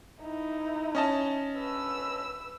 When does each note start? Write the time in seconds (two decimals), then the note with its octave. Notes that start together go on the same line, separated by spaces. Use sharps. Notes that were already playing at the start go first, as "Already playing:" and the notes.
0.23 D#4 E4
0.95 C#4 D#5 A5
1.57 B4 E6